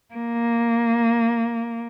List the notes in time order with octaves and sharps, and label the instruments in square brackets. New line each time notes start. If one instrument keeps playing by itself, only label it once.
[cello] A#3